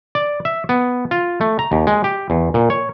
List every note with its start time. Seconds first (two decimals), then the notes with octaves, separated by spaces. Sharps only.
0.15 D5
0.45 E5
0.69 B3
1.11 F4
1.41 A3
1.59 A#5
1.72 D#2
1.87 G#3
2.04 G4
2.30 E2
2.54 A#2
2.70 C#5